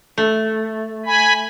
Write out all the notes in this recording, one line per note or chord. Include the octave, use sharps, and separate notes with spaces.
A3
G#5 B5